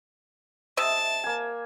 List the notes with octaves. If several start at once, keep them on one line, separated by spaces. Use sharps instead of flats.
C3 D#5 E5 A5
A#3 G#5